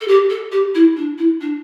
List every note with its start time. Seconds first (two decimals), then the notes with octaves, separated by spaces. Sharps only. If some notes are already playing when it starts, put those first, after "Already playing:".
0.01 A4
0.07 G4
0.30 A4
0.51 G4
0.74 E4
0.96 D4
1.18 E4
1.40 D4